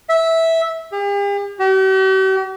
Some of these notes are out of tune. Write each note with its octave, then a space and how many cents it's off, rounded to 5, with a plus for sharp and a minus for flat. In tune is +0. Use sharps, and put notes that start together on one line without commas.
E5 -10
G4 +45
G4 -45